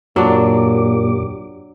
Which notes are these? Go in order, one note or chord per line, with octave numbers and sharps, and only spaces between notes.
F#2 A#2 F#3 D4 G4 D6